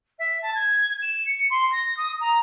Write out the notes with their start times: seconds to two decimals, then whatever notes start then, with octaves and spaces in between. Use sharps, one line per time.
0.18 E5
0.41 A5
0.55 G#6
1.02 E7
1.26 C#7
1.50 C6
1.72 A#6
1.96 D#6
2.20 A#5